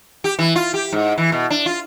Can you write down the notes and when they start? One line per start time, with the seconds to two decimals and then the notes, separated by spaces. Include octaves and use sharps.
0.24 G4
0.39 E3
0.56 F4
0.74 G4
0.92 G#2
1.18 E3
1.32 B2
1.50 D4
1.66 F4